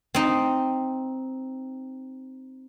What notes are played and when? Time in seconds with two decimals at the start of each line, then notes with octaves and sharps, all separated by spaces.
0.15 C4 D#4